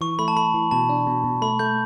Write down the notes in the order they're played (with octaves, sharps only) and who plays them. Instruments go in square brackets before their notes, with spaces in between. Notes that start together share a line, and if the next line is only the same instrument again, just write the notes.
[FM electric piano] E3 [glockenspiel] C#6
[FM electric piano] A3 [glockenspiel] B5
[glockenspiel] A5
[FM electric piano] A3 [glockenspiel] B5
[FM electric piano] E3
[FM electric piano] B2 [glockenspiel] A5
[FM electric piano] D4
B2
B2
[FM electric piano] A3 [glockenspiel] B5
[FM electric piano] A3 [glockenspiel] G6